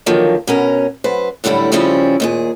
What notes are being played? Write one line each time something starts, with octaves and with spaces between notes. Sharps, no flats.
D3 D#3 F3 F#3 A#3
B2 C#4 A#4
F#2 B4 C5
F#2 A2 D3 G3 E4
C#3 F3 G3 C4 C#4 E4
D#2 A#2 G#4